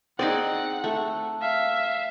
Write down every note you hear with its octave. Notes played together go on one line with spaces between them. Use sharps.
C4 D#4 G#4 D5 F#5
A3
E5 F5